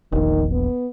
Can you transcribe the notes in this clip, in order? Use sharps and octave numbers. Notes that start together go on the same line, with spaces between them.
E1 A#1 D#3
B3